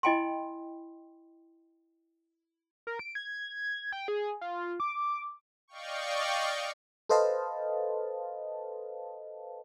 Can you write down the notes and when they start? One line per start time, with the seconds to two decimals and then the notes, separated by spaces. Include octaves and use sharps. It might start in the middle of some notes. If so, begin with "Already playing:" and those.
0.03 E4 D#5 G5 G#5 B5 C6
2.87 A#4
2.99 D7
3.15 G#6
3.92 G5
4.08 G#4
4.41 F4
4.80 D6
5.68 D5 D#5 F5 G5 C#6
7.09 A4 B4 C5 D#5 F5 A5